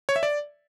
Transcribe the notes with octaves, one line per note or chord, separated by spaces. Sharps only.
C#5
E5
D5